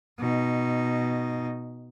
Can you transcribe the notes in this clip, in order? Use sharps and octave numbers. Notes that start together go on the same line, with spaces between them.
B2 D#4